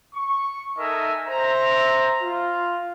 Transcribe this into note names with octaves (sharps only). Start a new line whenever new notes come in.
C#6
D#4 A4 A#4 D#5 E5 G#5
C5 E5 A#5
F4